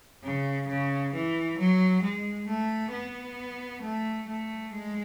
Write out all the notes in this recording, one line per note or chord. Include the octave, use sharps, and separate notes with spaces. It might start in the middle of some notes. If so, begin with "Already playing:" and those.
C#3
C#3
E3
F#3
G#3
A3
B3
A3
A3
G#3